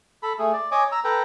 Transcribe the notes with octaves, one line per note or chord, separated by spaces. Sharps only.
A4 B5
A3 G#4
D5
C#5 D#5 G#5 D6
A#5 E6
A4 B4 G5 A#5